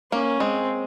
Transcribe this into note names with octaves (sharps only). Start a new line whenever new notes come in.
A#3 C#4
G#3 C4